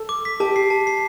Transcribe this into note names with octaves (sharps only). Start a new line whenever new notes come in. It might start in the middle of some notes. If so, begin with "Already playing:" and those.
Already playing: A4
D6
B6
G4 A5
C7
A5
C7